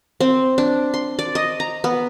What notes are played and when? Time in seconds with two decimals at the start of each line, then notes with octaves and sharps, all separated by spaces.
0.20 C4
0.58 D4
0.94 C6
1.19 D5
1.35 D#5
1.60 A#5
1.84 B3